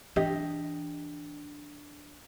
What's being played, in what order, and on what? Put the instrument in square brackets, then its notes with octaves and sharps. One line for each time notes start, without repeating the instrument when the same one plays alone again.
[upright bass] E3 D4 [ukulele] G4 D#5